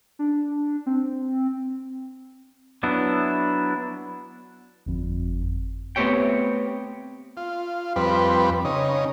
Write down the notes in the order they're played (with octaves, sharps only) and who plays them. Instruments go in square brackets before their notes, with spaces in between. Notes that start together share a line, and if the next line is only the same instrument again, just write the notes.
[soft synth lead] D4
C4
[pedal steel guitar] F#3 B3 D4 E4
[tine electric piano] G1 F2
[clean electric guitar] A3 B3 C4 G4 C#5 G5
[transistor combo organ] F4
F2 G3 C4 B4
C#3 D#4